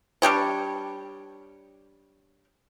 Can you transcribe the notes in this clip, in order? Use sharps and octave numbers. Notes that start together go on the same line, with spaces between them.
G3 D4 G4 C#5